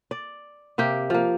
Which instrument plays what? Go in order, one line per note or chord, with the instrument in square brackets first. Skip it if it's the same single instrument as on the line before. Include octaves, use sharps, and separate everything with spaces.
[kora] D5
C3 A#3 G4
F3 A#3